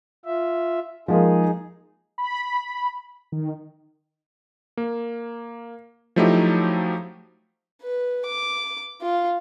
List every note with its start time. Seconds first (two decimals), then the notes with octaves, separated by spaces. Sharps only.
0.25 F4 E5
1.08 F3 G#3 A#3 D#4 G#4
2.18 B5
3.32 D#3
4.77 A#3
6.16 F3 F#3 A3 D#4 E4 G4
7.82 B4
8.26 D6
9.01 F4